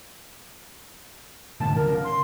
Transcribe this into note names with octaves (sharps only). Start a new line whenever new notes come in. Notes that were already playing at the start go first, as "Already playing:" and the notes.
G#2 D3 A5
D3 G3 C4 A#4
C#3
C6